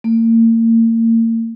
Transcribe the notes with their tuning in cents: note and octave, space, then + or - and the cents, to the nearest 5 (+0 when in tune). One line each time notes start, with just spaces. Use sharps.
A#3 -40